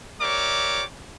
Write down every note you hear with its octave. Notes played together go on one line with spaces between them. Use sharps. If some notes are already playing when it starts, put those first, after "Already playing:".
G4 A#4 C#5 D5 E5 D6